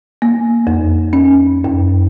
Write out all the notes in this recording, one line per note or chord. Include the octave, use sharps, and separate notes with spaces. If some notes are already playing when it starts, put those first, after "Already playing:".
A#3
F2
C#4
F#2